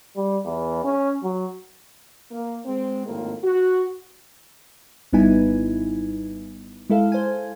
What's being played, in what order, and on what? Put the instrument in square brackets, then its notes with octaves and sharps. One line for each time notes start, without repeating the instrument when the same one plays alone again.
[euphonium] G3
E2
C#4
F#3
[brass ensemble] A#3
G#3 C4
G#1 F2 A2 A#3
F#4
[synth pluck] G#1 G3 B3 D#4 E4 G#5
G#3 E4 A4 F5
C5 G#5